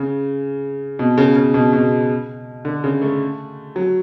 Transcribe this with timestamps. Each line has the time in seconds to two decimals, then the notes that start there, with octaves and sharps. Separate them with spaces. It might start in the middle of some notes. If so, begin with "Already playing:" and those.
Already playing: C#3
0.99 B2
1.18 C#3
1.36 C#3
1.54 B2
1.73 B2
2.65 D3
2.84 C#3
3.02 A3
3.76 F#3